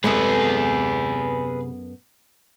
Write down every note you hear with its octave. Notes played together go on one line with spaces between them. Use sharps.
F#2 C3 G#3 B3 G#4 A4 B4